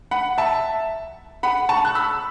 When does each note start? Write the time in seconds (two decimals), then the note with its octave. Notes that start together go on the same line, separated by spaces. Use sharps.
0.11 F#5 B5
0.38 E5 A5
1.43 F#5 B5
1.69 A5 C#6
1.85 F#6
1.95 B5 E6